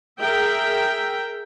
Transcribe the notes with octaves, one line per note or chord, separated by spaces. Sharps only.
G#4 A#4 E5 G5